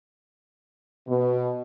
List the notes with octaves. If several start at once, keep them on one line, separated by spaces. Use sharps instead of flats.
B2